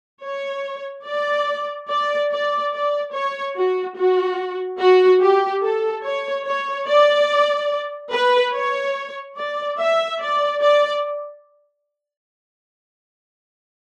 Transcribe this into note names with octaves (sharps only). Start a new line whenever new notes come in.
C#5
D5
D5
D5
D5
C#5
F#4
F#4
F#4
G4
A4
C#5
C#5
D5
B4
C#5
D5
E5
D5
D5